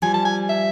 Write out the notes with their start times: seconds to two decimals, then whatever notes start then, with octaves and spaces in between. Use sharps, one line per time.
0.02 F3 G3 G#5
0.14 A5
0.25 G#5
0.49 E5